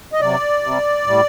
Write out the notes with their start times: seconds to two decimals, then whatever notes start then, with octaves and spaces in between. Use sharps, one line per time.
0.13 D#5
0.21 C3 F#3 D5
0.63 C3 G3
1.06 A2 G3